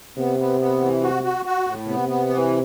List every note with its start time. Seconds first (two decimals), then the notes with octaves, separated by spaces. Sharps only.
0.17 C3 B3
0.39 B3
0.61 B3
0.81 E3
1.03 F#4
1.23 F#4
1.45 F#4
1.67 A2
1.87 C3 B3
2.09 B3
2.30 E3